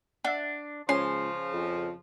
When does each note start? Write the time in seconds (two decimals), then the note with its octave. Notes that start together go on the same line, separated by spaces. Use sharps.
0.25 D4 E5 F#5
0.89 C#2 C#3 F3 C#4 C#5 G#5 C6
1.53 F2